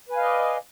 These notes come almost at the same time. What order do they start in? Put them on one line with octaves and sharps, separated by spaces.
B4 G#5 F5 D#5 D5